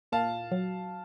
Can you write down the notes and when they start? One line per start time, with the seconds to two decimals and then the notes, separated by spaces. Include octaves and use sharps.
0.12 A#2 F5 A5
0.51 F#3